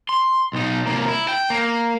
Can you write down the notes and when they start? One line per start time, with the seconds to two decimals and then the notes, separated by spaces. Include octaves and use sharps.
0.09 C6
0.53 B1 D#4
0.87 C3 A#3
1.08 E4
1.29 G5
1.50 A#3